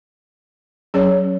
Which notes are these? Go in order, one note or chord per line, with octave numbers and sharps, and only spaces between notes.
F#3 C#4 G#4 C#5